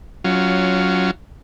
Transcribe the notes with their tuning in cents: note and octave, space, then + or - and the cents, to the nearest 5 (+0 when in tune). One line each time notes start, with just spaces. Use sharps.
F#3 +5 C#4 +10 F4 -10